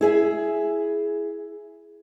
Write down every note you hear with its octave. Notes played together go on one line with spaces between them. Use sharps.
E4 G#4 E5